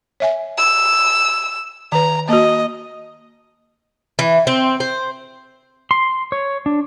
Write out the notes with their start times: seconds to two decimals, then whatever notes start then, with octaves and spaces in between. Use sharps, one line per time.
0.20 C#5 E5 G#5
0.58 E6
1.92 D#3 B4 A#5
2.29 A#3 F#4 D#5
4.19 E3
4.47 C4
4.80 C5
5.91 C6
6.32 C#5
6.66 D4